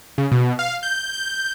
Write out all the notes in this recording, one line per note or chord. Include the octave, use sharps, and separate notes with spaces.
C#3
B2
F5
G6
G6